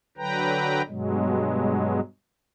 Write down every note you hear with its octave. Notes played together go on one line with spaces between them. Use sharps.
D3 F#3 B4 G5 A#5
G2 B2 F#3 G#3